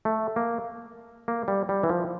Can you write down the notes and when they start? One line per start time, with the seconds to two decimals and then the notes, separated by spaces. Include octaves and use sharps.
0.05 A3
0.36 A#3
1.28 A#3
1.48 G3
1.69 G3
1.83 E3
1.89 F3